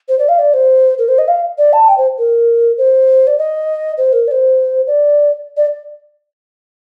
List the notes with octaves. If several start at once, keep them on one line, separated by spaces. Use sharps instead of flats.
C5
D5
F5
D5
C5
A#4
C5
D#5
F5
D5
A5
G5
C5
A#4
C5
D5
D#5
C5
A#4
D5
C5
D5
D5